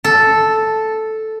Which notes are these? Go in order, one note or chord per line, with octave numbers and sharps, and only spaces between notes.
A4